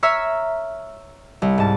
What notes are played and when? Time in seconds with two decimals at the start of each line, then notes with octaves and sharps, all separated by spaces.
0.03 C#5 E5 A#5 E6 F6 B6
1.42 C2
1.58 G#2 A5